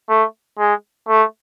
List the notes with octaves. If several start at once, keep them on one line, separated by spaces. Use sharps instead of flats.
A3
G#3
A3